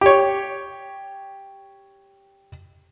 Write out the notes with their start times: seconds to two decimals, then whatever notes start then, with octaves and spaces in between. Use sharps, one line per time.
0.01 G4 C#5